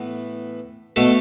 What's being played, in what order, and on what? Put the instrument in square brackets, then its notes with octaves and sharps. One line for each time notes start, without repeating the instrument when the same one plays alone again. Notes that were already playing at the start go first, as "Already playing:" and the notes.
Already playing: [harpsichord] A2 E3 B3
B2 A3 A4